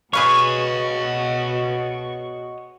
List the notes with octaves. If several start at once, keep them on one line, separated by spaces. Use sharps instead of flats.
B2 F#4 G#4 B4 C#5 D#5 F5 C#6